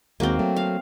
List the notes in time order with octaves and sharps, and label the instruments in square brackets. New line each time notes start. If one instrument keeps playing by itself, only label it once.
[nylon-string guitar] D#2 G#3 F#4 [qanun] A#3 C4
[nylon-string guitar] F#3 A3
[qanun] F5